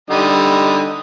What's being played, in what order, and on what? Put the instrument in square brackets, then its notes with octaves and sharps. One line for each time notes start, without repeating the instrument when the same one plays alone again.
[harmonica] D3 G3 D#4